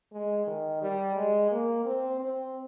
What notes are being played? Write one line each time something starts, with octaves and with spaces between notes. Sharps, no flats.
G#3
D#3
G3
G#3
A#3
C4
C4